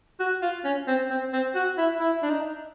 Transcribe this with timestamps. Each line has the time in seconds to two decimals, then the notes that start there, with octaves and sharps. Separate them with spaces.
0.20 F#4
0.43 F4
0.65 C#4
0.88 C4
1.10 C4
1.33 C4
1.55 F#4
1.78 E4
2.00 E4
2.23 D4
2.30 D#4